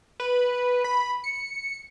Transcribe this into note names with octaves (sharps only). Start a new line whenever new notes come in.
B4
B5
C#7